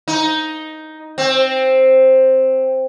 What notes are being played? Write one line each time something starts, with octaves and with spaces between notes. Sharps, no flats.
D#4
C4